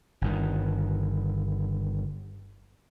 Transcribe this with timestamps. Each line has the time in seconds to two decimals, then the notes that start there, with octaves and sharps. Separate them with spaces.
0.21 G1 G2 D#3